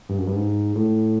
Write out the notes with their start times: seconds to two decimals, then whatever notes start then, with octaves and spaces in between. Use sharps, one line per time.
0.09 G2
0.18 F#2
0.27 G2
0.35 G#2
0.76 A2